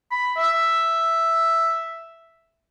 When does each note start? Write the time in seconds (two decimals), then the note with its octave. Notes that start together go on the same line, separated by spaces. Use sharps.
0.11 B5
0.37 E5